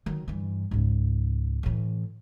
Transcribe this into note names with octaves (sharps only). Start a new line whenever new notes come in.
D#3 F#3
G2 E3
C#2 G#2
A2 E3